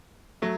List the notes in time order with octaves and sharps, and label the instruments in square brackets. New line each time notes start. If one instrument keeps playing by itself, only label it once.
[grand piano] F#3 A3